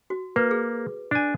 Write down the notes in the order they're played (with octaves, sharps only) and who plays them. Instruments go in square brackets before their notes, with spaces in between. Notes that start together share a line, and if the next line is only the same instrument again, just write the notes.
[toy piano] F#4
[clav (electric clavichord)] A#3 [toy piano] B4
[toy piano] G#4
[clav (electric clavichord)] D4 G#5